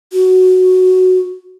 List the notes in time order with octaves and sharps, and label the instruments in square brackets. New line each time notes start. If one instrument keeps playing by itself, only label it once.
[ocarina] F#4